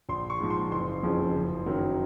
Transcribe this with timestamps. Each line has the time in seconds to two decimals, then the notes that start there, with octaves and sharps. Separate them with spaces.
0.09 A#1 C6
0.30 C#6
0.40 G#2 F3
0.50 C6
0.71 F#1 C6
1.03 F2 C#3 F3
1.34 F#1
1.66 F#2 D#3 F#3